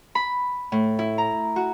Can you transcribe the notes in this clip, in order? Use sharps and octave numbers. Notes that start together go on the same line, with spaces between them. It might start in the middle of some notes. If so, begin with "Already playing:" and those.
B5
A2
E4
A#5
F#4